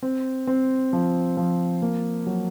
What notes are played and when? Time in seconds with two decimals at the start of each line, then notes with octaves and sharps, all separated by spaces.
0.02 C4
0.47 C4
0.93 F3
1.37 F3
1.82 A#3
2.27 F#3